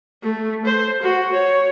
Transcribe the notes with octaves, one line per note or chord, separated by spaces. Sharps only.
A3
C5
F#4
C#5